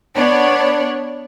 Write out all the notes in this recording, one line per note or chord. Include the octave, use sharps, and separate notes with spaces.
B3 D4 C#5